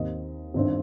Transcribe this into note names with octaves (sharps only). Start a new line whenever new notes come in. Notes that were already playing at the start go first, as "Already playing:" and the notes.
Already playing: D#2 D#3 C4 D#5
G1 G2 D#3 C4